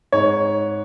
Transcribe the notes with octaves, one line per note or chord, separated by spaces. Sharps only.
G#2 C#5